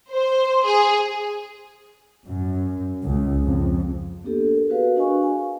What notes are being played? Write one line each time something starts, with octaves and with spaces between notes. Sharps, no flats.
C5
G#4
F#2
C#2
F2
A#3 B3 D4 G4 A4
A#4
F#4 G#4 B4 F5
D4 F#4 D#5 F5 G#5 C#6
G#5